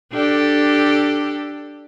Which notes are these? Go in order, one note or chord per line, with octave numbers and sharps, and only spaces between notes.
D4 G4 A4